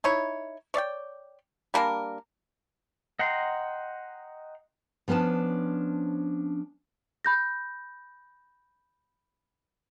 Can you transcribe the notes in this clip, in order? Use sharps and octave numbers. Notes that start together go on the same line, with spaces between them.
D#4 E4 C#5
C#5 D5 E5 G5
G3 A#3 D4 A#4
D#5 F#5 G5 A#5 C6
F3 B3 C#4 D4 A5
B5 G6 A#6